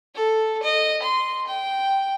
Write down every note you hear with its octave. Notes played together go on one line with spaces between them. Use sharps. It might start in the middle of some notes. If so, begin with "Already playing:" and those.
A4
D#5
C6
G5